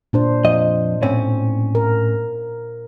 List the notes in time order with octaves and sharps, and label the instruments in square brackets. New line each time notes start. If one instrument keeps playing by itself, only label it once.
[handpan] A#2 D4 C5
[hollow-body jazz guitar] F2 D#5
A2 C4 C#4
[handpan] A#4